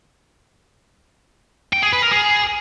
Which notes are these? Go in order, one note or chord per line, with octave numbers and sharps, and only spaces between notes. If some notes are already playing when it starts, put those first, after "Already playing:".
G5
G#4
B4
A#4
G#4